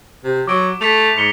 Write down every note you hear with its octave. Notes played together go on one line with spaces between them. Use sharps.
C3
F#3 D6 D7
A3 B6 F7
G#2 B6 C#7 G7